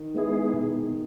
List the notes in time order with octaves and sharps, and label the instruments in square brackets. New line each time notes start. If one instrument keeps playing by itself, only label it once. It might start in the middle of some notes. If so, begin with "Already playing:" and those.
Already playing: [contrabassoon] D#3
[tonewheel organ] G#3 B3 E4 G#4
B2